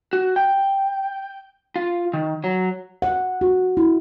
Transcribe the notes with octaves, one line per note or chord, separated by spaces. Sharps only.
F#4
G5
F4
D#3
F#3
F#5
F#4
E4